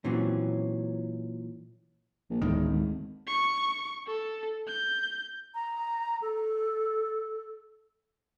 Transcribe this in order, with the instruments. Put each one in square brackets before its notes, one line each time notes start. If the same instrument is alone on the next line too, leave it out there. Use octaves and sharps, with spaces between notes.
[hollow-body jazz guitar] A#2 E3 F#3 C4 C#4
[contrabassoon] A#1
[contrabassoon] E1 [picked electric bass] D2 A2 D#3
[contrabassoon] G#1
[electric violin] C#6
A4
G6
[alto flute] A#5
A4